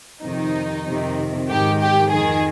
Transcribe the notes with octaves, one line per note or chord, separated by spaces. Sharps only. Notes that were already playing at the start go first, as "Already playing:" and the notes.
F2 C3 D#3 D#4
F2 C3 D#3
G#2 D#3 G4
G4
F2 D#3 G#4